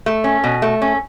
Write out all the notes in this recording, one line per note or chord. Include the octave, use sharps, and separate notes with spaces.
A3
C#4
B2
A3
C#4